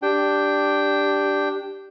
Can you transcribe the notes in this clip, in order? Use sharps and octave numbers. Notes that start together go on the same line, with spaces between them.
D4 G4 G5